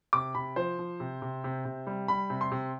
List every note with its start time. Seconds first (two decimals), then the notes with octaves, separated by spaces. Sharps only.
0.13 C3 D6
0.35 C3 B5
0.56 F3 C5
0.79 F3
1.00 C3
1.22 C3
1.44 C3
1.65 C3
1.87 G3
2.08 G3 B5
2.30 C3
2.41 C6
2.52 C3